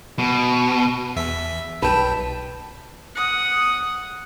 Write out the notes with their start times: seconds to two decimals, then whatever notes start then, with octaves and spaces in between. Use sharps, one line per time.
0.19 B2
1.16 E2 E5 B6
1.82 B1 B4 G5 A5
3.15 F#5 D#6